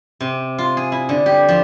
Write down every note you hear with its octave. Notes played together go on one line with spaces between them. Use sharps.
C3
F4
G#4
E4
D3
G4
F3